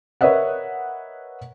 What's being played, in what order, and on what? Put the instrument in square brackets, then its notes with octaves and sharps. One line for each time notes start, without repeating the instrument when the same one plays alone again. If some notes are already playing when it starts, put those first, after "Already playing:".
[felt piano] A#4 B4 C#5 D#5 E5 F#5